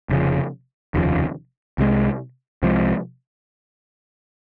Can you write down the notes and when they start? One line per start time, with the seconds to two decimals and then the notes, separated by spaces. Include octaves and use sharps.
0.09 F1 D#2 C#3 F3
0.94 F1 D#2 C#3 F3
1.78 C2 C3 F3 G#3
2.62 C2 C3 F3 G#3